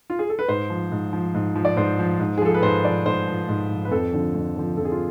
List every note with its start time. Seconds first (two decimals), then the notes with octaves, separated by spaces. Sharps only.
0.10 F4
0.19 G#4
0.29 A4
0.39 B4
0.49 G#2 C5
0.70 F3
0.92 G#2
1.13 F3
1.34 G#2
1.55 F3
1.65 D5
1.77 G#2 C5
1.99 F3
2.20 G#2
2.38 G#4
2.41 F3 A4
2.54 B4
2.63 G#2 C5
2.84 F3 D5
3.06 G#2 C5
3.27 F3
3.49 G#2
3.70 F3
3.85 B4
3.91 F2 A4
4.13 D3 F3
4.35 F2
4.56 D3 F3
4.77 F2 A4
4.85 G#4
4.92 F4